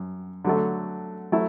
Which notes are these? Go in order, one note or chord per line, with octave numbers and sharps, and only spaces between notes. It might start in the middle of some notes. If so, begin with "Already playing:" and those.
Already playing: F#2
D3 F#3 A3
F#3 A3 E4